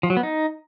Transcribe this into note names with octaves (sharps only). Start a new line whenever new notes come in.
F3
F#3
B3
D#4